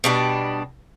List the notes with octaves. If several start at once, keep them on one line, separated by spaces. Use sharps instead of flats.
B2 G3 D4